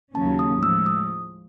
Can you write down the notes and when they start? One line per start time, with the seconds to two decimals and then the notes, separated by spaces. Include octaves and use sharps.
0.15 D#2 C#3 F#3 A#3 C#4 A5
0.39 D#6
0.62 A2 F3 G#3 E6
0.86 D#6